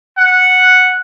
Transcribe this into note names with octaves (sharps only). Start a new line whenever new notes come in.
F#5